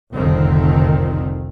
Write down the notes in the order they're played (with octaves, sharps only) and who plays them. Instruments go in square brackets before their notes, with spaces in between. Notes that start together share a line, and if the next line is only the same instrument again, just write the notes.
[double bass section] F1 C2 D3 D#3 F3 C4